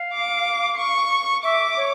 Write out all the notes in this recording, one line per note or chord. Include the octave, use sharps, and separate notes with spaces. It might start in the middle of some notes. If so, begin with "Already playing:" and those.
Already playing: F5
D6
C#6
E5 D6
C#5